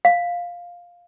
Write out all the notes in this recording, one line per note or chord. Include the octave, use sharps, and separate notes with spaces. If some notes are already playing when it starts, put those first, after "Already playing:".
F5